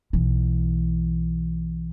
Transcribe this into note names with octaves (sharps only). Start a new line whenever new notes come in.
B1 E3